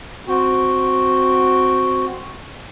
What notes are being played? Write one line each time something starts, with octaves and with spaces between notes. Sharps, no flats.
C4 F#4 G5